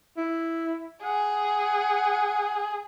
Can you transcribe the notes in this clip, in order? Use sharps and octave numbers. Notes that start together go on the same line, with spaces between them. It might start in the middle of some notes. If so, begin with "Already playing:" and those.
E4
G#4 F#5